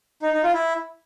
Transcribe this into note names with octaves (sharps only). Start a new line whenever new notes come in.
D#4
D#4
F4
E4